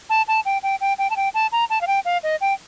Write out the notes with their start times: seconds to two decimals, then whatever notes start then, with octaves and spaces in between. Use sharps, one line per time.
0.10 A5
0.28 A5
0.45 G5
0.63 G5
0.81 G5
0.98 G5
1.10 A5
1.16 G5
1.34 A5
1.52 A#5
1.70 A5
1.81 F5
1.87 G5
2.05 F5
2.23 D#5
2.41 G5